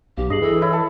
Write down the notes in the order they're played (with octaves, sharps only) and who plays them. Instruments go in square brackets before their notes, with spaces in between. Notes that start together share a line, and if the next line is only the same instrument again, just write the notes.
[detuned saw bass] B1 [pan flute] G4 [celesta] F5
[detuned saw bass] G2 [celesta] G#4 C7 F#7 [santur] D#5
[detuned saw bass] E3 [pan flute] A4
[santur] E4 [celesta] C#5
[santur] A4